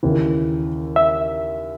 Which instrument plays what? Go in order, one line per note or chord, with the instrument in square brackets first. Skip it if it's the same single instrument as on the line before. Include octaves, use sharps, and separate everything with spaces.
[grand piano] D#2 C#3 E3
[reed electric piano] E5